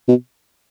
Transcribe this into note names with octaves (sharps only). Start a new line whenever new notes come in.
B2